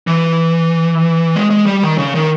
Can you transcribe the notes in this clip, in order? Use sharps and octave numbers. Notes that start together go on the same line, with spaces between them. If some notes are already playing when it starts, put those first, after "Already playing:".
E3
G#3
G#3
G3
D#3
C#3
D#3